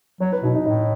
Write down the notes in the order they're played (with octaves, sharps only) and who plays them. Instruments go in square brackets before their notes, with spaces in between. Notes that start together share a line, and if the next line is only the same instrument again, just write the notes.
[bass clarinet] F#3 [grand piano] C#5
[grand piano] B4
[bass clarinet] B2 [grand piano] D#4
[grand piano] D#4
[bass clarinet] A2 [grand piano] D#4